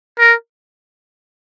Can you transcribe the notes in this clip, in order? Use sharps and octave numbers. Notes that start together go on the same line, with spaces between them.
A#4